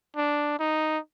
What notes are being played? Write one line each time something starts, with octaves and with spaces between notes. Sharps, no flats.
D4
D#4